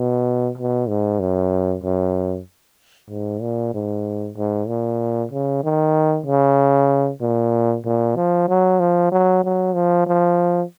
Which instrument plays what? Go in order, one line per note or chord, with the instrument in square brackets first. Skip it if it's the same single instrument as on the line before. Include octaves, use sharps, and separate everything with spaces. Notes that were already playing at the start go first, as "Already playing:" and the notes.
Already playing: [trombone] B2
B2
G#2
F#2
F#2
G#2
A#2
G#2
G#2
A#2
C#3
D#3
C#3
A#2
A#2
F3
F#3
F3
F#3
F#3
F3
F3